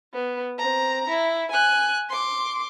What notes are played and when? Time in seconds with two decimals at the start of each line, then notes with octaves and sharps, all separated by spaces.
0.14 B3
0.58 C4 A#5
1.09 E4
1.52 G#5 F#6
2.10 C6 D6